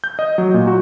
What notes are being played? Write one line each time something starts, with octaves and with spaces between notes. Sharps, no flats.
G6
D#5
F#3
A#2
F#4